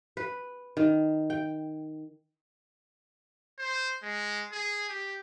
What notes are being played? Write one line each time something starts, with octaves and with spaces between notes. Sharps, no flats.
B4
D#3
G5
C5
G#3
G#4
G4